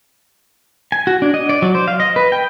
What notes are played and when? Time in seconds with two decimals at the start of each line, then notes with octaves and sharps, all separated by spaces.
0.92 G#5
1.07 F#4
1.22 D4
1.34 D#5
1.49 D5
1.62 F#3
1.75 C5
1.88 F5
2.00 D#5
2.16 B4
2.32 G5